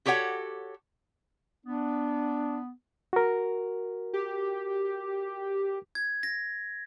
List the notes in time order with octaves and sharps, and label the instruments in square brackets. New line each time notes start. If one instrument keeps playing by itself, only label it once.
[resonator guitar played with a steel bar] F#4 G4 A4 C#5 F#5
[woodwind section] B3 [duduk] D4
[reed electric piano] F#4 A#4
[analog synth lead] G4
[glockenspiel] G#6
A#6